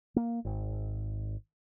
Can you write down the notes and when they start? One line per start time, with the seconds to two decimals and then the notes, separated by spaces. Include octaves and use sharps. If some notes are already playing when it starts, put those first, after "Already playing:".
0.16 A#3
0.45 G#1